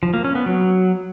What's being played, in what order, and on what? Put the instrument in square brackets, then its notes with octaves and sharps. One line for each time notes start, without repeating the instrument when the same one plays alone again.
[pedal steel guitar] F3
A#3
C#4
B3
F#3